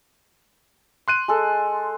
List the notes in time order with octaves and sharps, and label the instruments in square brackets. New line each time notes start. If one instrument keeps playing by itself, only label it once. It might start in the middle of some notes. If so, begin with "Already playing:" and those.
[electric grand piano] C6 F#6 D#7
[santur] G#3 A4